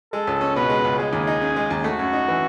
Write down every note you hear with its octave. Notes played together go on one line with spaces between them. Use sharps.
G#3 A4
C#2
C#4
B2 B4
G#3
C#2
G#3 G#4
D#2
D#4
C#3
G#3
D#2
A3 F#4
F#2
D#4
E3